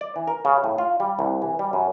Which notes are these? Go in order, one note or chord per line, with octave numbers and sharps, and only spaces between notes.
D5
E3
A#4
C#3
A2
F4
G3
C2
E3
G3
F#2